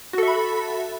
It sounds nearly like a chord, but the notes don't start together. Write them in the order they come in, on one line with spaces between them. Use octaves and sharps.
F#4 A4 E5 B5